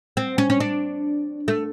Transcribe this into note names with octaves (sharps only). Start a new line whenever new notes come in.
C4
C#4
C#4
D4
A3